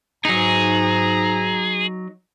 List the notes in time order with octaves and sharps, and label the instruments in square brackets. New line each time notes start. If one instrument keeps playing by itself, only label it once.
[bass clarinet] G#2 [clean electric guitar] F#3 D#4 [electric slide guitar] G#4 [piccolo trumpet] A#5